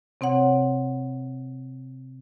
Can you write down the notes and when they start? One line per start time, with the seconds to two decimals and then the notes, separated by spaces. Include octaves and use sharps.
0.21 C3 C4 C#5 F#5